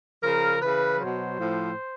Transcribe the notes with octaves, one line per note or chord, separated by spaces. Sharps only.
C#3 F3 A#4
C#3 E3 B4
B2 F#3 C5
A2 F3